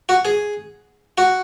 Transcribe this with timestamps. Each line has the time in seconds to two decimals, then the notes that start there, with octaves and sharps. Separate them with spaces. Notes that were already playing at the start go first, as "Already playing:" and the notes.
0.09 F#4
0.25 G#4
1.18 F#4